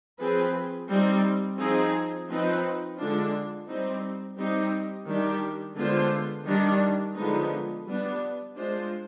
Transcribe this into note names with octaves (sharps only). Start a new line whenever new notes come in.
F3 C4 F4 G#4 B4
G3 C4 D#4
F3 C4 D#4 G#4
F3 C4 D#4 B4
D3 G#3 D4 F4
G3 C4 D#4
G3 C4 D#4 G4
D#3 G3 D4 G4
D3 G#3 B3 F4 C5
D#3 G3 D4
D3 F3 G#3 B3 D#4
G3 B3 D4
G#3 D4 F4 C5